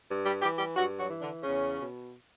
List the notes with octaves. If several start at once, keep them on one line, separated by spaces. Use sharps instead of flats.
G2
G3 G4
E3 G3 G4
G3 G4
G2 F#3 F#4
F#3 F#4
E3
D3 D4
E2 C#3 C#4
B2